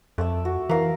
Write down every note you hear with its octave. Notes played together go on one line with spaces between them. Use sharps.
F2 A3 D5 E5
F#4
E3 A#4 F5